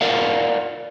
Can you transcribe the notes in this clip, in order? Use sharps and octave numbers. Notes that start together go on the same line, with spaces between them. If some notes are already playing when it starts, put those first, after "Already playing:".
A#4 D5 F5 F#5